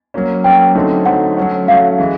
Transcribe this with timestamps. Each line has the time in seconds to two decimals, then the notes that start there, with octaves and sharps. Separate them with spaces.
0.14 F#3 A#3 C#4
0.44 F#3 A#3 C#4 G5
0.75 D3 F#3 A3 C4 D#4
1.06 D3 F#3 A3 C4 D#4 F#5
1.37 F#3 A3 C#4 F#4
1.68 F#3 A3 C#4 F#4 F5
1.99 E3 G#3